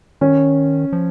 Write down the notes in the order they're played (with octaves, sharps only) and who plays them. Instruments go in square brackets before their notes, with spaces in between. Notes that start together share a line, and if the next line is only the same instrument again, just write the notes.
[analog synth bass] D#3 [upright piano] C#4
[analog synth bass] F3